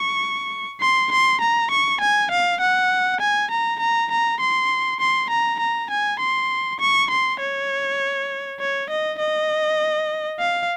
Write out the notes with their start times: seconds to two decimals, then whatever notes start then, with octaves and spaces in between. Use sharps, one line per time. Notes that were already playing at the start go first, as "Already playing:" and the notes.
Already playing: C#6
0.81 C6
1.11 C6
1.41 A#5
1.71 C#6
2.00 G#5
2.31 F5
2.60 F#5
3.20 G#5
3.51 A#5
3.80 A#5
4.11 A#5
4.40 C6
5.00 C6
5.30 A#5
5.60 A#5
5.90 G#5
6.19 C6
6.80 C#6
7.10 C6
7.40 C#5
8.60 C#5
8.90 D#5
9.19 D#5
10.39 F5